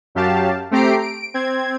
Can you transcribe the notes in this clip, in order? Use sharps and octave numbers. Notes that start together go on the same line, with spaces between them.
F#2 F#3 G4 F5 A5
A3 C4 G4 A#5 C7 D7
D7
C4 G#6